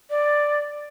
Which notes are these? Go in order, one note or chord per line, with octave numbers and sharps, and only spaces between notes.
D5